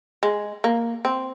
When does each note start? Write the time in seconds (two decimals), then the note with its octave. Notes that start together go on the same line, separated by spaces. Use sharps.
0.23 G#3
0.64 A#3
1.05 C4